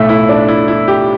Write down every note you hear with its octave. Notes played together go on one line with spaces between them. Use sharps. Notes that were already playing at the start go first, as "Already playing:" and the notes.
Already playing: B1 A2 A3 E5
E4
D4
E4
E4
G4